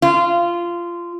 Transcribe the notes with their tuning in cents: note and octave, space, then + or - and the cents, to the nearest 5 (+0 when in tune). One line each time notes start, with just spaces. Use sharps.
F4 -15